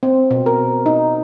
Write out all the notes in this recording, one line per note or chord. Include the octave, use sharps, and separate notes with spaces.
C4
B2
A#4
D#4